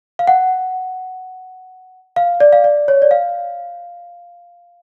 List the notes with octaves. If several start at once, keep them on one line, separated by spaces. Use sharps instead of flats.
F5
F#5
F5
D5
F5
D5
C#5
D5
F5